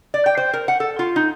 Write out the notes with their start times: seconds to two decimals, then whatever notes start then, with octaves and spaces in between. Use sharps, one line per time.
0.14 D5
0.26 G5
0.37 C5
0.53 A#4
0.68 F#5
0.80 A4
0.99 F4
1.16 D#4